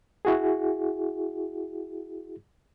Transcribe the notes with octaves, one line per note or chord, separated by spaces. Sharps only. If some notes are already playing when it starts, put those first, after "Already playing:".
E4 F#4 G#4